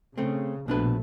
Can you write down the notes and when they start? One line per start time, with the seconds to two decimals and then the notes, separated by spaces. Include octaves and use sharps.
0.18 C#3 A3 C4
0.68 A#1 B2 A3 D4 B4